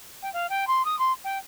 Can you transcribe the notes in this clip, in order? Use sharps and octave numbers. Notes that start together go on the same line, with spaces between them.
G5
F5
G5
C6
D#6
C6
G5